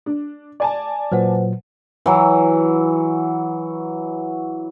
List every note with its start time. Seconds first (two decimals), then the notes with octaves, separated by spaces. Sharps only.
0.06 D4
0.60 D5 G#5 A5
1.12 A#2 F#3 B4 C5 F#5
2.06 E3 F#3